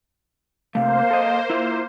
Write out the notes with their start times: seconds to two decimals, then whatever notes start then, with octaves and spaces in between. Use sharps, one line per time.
0.75 C3 A3 A#3 C5 F5
1.11 A4 D#5
1.50 E4 F4 E5